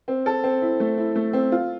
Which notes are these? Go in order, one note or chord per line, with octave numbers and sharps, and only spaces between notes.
C4
A4
C4
E4
A3
E4
A3
C4
F4